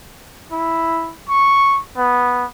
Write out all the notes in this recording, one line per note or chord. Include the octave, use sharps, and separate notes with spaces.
E4
C#6
B3